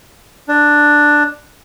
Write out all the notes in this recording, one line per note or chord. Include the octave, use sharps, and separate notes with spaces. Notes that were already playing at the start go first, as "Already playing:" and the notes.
D4